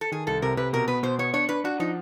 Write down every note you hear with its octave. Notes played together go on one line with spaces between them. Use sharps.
A4
D#3 G#4
C2 A4
C3 A#4
C3 B4
B2 A#4
B3 B4
B2 C5
B3 C#5
D4 C#5
D4 B4
D4 F#4
F3 D#4